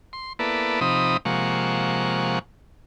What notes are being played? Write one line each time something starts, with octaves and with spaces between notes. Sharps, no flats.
C6
A#3 B3 E4 A4 B4 D5
C3 F3 C4 D#4 B5 D#6
C3 F3 G#3 A#3 F#5 C#6